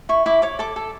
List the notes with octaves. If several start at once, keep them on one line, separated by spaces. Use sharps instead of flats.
E4 C#6
E4 D6
C#5 D6
A4 D6
A4